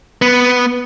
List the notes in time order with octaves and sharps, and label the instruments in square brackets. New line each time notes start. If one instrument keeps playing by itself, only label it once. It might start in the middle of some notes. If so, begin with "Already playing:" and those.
[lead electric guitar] B3